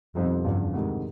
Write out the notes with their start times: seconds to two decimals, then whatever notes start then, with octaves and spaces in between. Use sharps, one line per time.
0.15 C2 F2 B2 G3 C4 D#4
0.44 E2 G2 C#3 F3
0.73 D2 G#2 C3 D#3